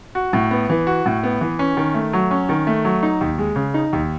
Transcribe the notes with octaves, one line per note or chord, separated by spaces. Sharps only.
F#4
A2
B3
E3
F#4
A2
B3
E3
C#4
D#3
A3
F#3
C#4
D#3
A3
F#3
D#4
D#2
G#3
C#3
D#4
D#2